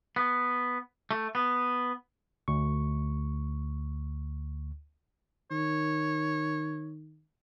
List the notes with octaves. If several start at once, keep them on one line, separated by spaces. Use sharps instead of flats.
B3
A3
B3
D2 C#6
D#3 C#5